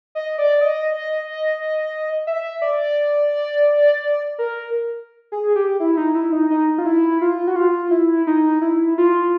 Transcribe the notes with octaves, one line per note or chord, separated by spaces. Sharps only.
D#5
D5
D#5
E5
D5
A#4
G#4
G4
E4
D#4
E4
D#4
D#4
F4
E4
F4
F#4
F4
E4
D#4
E4
F4